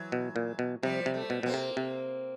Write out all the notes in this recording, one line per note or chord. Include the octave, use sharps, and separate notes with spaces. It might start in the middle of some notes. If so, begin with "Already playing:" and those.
Already playing: E3 F#3
B2
A#2
B2
C3 F3 G3
C3
G3 A3
B2
B2 A#3 C4
C3
C3